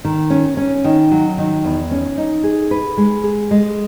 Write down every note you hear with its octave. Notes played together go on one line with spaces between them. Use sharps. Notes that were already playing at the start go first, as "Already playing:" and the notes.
D#3
C#4
C#4
D#3
F#3
D#3
E2
C#4
D#4
G#4
B4
G#3
G#4
G#3